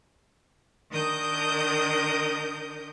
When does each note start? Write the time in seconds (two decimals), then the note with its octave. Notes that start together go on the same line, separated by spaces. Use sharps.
0.91 D#3 D4 A#4 D#5 D#6 G6